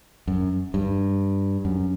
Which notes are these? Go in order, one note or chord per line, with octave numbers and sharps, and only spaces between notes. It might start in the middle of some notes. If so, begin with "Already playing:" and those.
F#2
G2
F#2